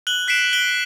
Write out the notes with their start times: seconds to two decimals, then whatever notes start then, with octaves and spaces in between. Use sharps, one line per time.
0.07 F#6 F#7 G7
0.28 F#6 B6 C7 D7 E7
0.53 F#6 B6 D7 G7